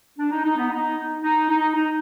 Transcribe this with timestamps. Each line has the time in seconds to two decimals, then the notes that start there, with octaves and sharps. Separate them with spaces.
0.18 D4
0.31 D#4
0.45 D#4
0.57 B3
0.71 D#4
1.23 D#4
1.49 D#4
1.75 D#4